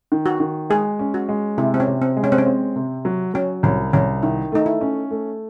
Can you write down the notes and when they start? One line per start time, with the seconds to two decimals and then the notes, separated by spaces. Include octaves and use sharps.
0.12 D#3
0.26 F#4
0.40 D#3
0.70 G#3 G#4
0.99 C#4
1.14 F#4
1.29 G#3
1.58 C3 E4
1.74 C4
1.80 C#4
1.87 C3
2.02 C4
2.17 G#3
2.24 C#4
2.32 C4
2.38 C#4
2.47 C4
2.76 C3
3.05 F#3
3.34 F#3 C#4
3.63 C2 C#4
3.93 C2 C#4
4.23 D#3 E4
4.52 A3 D#4
4.66 E4
4.81 C#4
5.11 A3